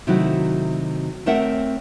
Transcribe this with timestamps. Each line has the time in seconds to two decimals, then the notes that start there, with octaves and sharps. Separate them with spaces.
0.07 C3 D#3 F#3 A3 E4 F#4
1.26 A3 C4 A#4 C#5 E5 F#5